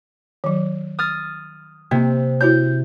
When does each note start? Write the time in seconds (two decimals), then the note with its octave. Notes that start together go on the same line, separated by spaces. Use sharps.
0.44 D#3 F#3
0.99 D#6 F6 A6
1.91 C3 A#3 C4
2.41 E4 F#4 C#5 G6